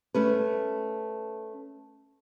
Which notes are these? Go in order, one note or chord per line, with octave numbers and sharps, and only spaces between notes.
A3 C#4 B4